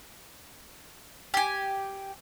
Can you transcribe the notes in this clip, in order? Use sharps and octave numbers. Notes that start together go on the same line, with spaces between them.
G4 G#5